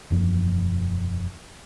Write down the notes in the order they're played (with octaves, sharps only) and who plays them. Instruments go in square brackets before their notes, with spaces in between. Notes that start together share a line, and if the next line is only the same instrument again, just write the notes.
[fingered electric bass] E1 F#2 F3 A#3